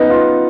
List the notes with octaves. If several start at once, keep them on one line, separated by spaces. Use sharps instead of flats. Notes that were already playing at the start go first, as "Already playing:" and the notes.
Already playing: B3 D#4
F4